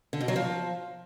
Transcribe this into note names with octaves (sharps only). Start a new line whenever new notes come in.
D3
B2
F#3
F3